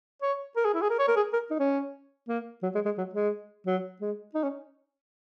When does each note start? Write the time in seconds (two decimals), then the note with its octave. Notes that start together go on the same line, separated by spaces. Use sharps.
0.22 C#5
0.56 A#4
0.65 G#4
0.74 E4
0.82 G#4
0.90 A#4
0.99 C#5
1.08 A#4
1.16 G#4
1.33 A#4
1.50 D#4
1.59 C#4
2.28 A#3
2.63 F#3
2.75 G#3
2.85 G#3
2.98 F#3
3.14 G#3
3.66 F#3
4.01 G#3
4.35 D#4
4.43 C#4